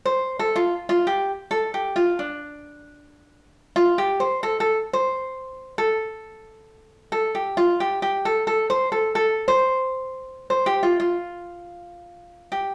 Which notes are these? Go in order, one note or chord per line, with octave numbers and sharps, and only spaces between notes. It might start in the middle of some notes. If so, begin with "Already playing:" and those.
C5
A4
F4
F4
G4
A4
G4
F4
D4
F4
G4
C5
A4
A4
C5
A4
A4
G4
F4
G4
G4
A4
A4
C5
A4
A4
C5
C5
G4
F4
F4
G4